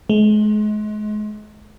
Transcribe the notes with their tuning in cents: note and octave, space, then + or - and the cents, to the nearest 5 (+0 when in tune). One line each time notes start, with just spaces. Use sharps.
G#3 +35